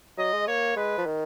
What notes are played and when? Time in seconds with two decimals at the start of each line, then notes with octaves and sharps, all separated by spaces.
0.17 F#3 D#5
0.33 G#3
0.47 A#3 C#5
0.76 G#3 B4
0.98 F3
1.06 D#3